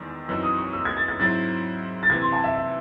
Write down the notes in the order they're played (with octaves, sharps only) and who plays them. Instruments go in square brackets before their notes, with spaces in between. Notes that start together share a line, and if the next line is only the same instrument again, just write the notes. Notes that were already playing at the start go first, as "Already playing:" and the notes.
Already playing: [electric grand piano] E2 D#3 G#3 [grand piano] E6
[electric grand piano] F#2 E3 C4 D#4 F#4 [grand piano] E6
[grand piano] D#6
C#6
E6
G#6
A6
G#6
[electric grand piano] G#2 F#3 C4 E4 C5 [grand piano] A6
[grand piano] A6
[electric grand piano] C3 E3 C4 [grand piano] G#6
[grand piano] C6
A5
E5
E5